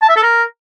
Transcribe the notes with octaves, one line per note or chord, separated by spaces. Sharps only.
A5
E5
A4
A#4